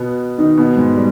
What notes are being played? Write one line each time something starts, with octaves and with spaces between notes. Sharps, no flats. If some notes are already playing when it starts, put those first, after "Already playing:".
Already playing: B2 B3
D#3 D#4
B2 B3
G#2 G#3
G3